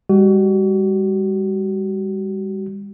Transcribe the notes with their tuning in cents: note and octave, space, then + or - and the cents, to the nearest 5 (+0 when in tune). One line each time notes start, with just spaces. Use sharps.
G3 +45 F#4 +35